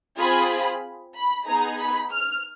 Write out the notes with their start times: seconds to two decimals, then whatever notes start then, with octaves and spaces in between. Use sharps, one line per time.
0.18 C4 F4 G#4 B5
1.15 B5
1.47 B3 D#4 G#4 A#5
1.79 B5
2.12 F6